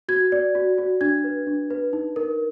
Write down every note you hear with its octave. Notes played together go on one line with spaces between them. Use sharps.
F#4 G#6
D5
F#4
F#4
D4 G#6
B4
D4
B4
D#4
A#4